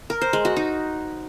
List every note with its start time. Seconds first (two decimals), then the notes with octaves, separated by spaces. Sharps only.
0.10 A#4
0.22 C5
0.33 G#3
0.45 F#4
0.56 D#4